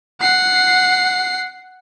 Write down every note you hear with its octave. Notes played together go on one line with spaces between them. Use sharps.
F#5 C7